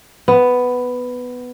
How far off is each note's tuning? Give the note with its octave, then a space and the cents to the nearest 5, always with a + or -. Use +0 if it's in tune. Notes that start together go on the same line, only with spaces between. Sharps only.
B3 +5